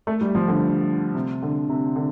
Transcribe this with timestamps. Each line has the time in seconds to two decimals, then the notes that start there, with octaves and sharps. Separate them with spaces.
0.07 A3
0.21 G3
0.35 F3
0.48 D3
1.15 C3
1.42 D3
1.69 C3
1.96 D3